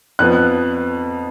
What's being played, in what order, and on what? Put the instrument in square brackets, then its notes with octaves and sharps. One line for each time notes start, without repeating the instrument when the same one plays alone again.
[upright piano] F2 F3 B3 F#6